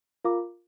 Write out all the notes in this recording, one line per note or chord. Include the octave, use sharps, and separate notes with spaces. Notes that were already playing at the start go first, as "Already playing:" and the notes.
F4 A#4 F5 A#5 D6